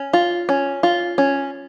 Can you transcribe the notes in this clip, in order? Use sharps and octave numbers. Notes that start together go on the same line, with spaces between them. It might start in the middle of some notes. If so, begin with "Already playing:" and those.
Already playing: C#4
F4
C#4
F4
C#4